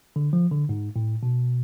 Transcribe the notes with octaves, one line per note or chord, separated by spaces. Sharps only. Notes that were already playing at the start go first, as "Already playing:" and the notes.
D3
F3
D3
G#2
A2
B2